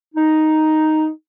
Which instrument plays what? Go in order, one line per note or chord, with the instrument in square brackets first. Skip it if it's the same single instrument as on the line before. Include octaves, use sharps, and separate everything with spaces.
[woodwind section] D#4